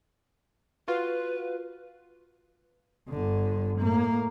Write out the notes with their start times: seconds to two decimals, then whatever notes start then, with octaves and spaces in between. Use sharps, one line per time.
0.88 F4 F#4 B4
3.09 G1 D3
3.79 A2 A#3